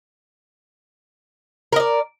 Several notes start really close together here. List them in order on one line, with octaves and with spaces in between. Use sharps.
A#4 D#5 D5